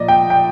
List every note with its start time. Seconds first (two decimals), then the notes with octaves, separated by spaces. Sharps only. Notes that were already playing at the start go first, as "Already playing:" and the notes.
Already playing: A#2 F3 D5 D#5
0.08 G5
0.30 G5